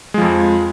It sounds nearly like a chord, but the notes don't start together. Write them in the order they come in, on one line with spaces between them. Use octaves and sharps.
G#3 F3 F2